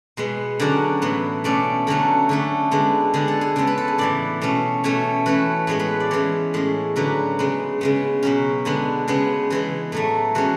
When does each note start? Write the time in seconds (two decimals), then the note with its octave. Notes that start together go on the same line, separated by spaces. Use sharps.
0.17 B2 G#3 B3
0.60 D3 F#3 C#4 D5
1.02 A2 E3 B3
1.44 B2 A3 C#4 D5
1.87 D3 F#3 A3 C#4
2.29 D3 A3 C#4
2.71 D3 G#3 B3
3.14 D3 G#3 B3 G#4
3.28 A4
3.41 G#4
3.56 C#3 G#3 B3 A4
3.67 B4
3.78 A4
3.88 G#4
3.98 A2 E3 B3 D5
4.42 B2 A3 C#4
4.84 B2 A3 C#4 C#5
5.26 E3 A3 C#4 B4
5.67 A2 G#3 B3 C#5
5.79 B4
6.00 D5
6.11 E3 G#3 C#4 C#5
6.54 A2 G#3 C#4
6.96 D3 F#3 C#4 B4
7.39 C#3 G#3 B3
7.81 C#3 G#3 B3
8.23 B2 F#3 C#4
8.65 D3 G#3 B3
9.08 C#3 G#3 B3 G#4
9.50 E3 G#3 B3
9.92 A2 F#3 A3
10.35 E3 G#3 C#4 F#4